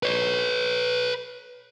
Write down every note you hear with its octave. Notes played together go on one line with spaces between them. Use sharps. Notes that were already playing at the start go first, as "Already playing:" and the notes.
B4 C#5